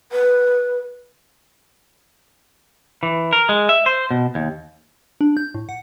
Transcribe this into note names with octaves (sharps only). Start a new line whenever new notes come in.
B4
E3
A#4
G#3
E5
C5
B2
D#2
D4
G6
A2
F#5